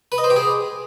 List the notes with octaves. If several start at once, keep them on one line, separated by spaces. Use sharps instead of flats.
B4
D#5
C5
G4
G#4